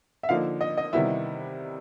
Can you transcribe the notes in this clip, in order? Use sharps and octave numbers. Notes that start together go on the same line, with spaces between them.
E5
D3 F3 A#3 D#4 F5
D#5
D#5
C3 D#3 G3 B3 E4 E5